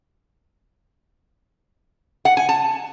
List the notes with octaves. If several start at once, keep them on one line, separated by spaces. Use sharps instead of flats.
F#5
G#5
A5